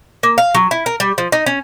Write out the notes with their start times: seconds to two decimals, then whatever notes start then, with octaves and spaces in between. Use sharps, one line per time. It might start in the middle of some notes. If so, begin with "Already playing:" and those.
0.23 A#3
0.38 F5
0.54 F#3
0.71 E4
0.86 A#4
1.00 G3
1.18 F3
1.32 D#4
1.46 C#4